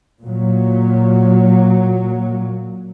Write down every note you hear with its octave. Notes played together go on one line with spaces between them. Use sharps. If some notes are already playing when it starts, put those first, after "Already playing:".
A#2 F#3